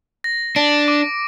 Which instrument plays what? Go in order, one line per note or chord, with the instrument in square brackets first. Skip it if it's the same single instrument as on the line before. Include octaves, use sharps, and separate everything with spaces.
[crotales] A#6
[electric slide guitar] D4 [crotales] D7
[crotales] D6